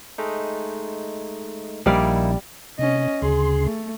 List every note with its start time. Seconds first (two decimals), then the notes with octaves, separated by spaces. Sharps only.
0.18 G#3 A3 D#4
1.86 A#1 G3 A#3 D#4 E4 D5 F5
2.79 C3 C#4 D#5
3.22 D2 C#3 G#4 C6
3.63 A3